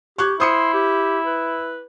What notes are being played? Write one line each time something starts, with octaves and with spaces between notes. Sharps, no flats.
G4 C#6 F#6 G#6
E4 C5 C6 D#6 C#7
G4
B4